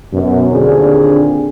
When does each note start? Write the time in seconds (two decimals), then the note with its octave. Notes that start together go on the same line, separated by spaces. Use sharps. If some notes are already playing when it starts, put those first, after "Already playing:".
0.13 F#2 B2
0.51 D#2 A#2 D3 C4 D4 G#4